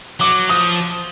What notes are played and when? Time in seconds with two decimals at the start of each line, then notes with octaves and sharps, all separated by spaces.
0.20 F#3 D6
0.50 F3 D#6